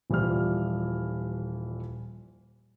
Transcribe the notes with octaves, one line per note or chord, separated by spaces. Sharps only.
D#1 E3 F3 G3 E4 F6